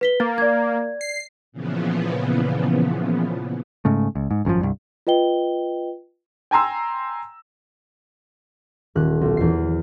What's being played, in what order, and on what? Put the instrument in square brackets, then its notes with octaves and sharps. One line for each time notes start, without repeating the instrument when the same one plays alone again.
[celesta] B4 B6 G7
[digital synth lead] A#3 [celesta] A6
[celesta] D5 G#6
[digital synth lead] C7
[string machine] A#2 C#3 E3 F3 B3
[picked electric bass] G#2 C#3 A3
C#2
G#2
G#1 F#2 A#2 F3
C2 G2
[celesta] F4 B4 D#5 G5 G7
[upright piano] G5 G#5 A#5 C6 E6
[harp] D#1 F#6
B1
E2 C7